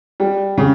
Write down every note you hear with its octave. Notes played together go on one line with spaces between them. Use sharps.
G3
C#3